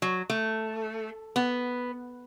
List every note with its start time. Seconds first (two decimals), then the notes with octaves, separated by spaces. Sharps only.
0.02 F#3
0.30 A3
1.36 B3